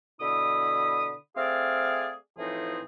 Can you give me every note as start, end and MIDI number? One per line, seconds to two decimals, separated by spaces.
0.21 1.14 47
0.21 1.14 50
0.21 1.14 64
0.21 1.14 83
0.21 1.14 87
1.37 2.14 57
1.37 2.14 60
1.37 2.14 68
1.37 2.14 74
1.37 2.14 77
2.38 2.80 45
2.38 2.80 52
2.38 2.80 53
2.38 2.80 60
2.38 2.80 63
2.38 2.80 68